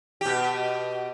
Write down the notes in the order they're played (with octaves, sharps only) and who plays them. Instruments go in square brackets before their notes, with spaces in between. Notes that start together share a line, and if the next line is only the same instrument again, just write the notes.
[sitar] B2 G4